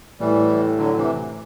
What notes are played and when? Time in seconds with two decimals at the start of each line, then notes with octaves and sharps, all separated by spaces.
0.20 A2 E3 G3
0.78 D3 F#3
0.97 C3 E3